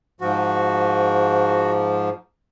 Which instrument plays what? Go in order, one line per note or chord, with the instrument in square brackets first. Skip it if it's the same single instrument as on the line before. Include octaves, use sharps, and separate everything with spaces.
[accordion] G#2 F3 [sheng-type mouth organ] F#4